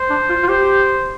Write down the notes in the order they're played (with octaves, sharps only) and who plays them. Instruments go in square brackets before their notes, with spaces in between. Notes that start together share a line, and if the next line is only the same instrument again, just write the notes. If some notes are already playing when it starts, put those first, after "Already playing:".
Already playing: [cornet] C5
[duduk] D4
F4
F4
[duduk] G4 [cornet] C5